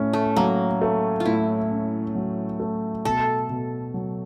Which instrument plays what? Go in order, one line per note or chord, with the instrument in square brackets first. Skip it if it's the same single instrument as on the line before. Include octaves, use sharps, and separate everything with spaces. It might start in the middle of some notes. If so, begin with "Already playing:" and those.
Already playing: [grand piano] A2 C#4
[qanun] A3
[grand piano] F#3 [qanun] A#3
[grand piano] A3
[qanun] F4
[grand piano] A2 [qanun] E4
[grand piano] C#4
F#3
A3
[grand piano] B2 [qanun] A4
[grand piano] B2
F#3